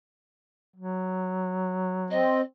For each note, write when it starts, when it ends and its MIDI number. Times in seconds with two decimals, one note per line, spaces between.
0.76 2.28 54
2.10 2.41 60
2.10 2.40 75